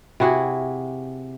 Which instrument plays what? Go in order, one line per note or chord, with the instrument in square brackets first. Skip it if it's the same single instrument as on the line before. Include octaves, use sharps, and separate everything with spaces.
[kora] C3 E4 F#4 G#4